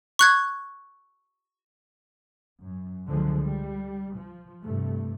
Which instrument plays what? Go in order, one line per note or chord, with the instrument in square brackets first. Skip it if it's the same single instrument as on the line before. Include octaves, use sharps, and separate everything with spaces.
[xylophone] C#6 F#6 G#6
[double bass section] F#2
C#2 D3 F3 F#3 G#3
G3
F3
G2 C3 A3